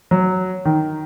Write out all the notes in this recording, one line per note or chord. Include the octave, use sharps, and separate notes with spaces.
F#3
D#3